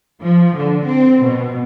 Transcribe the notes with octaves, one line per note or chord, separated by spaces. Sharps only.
F3
D3
C4
B2